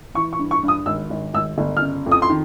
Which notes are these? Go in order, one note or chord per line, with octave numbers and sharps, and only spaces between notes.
E3 C#6
C#6
G2
C#6
G2
D#6
G#1 E6
G#1
G#1 E6
G1
F6
C#3
F2
D#6
C6
D#3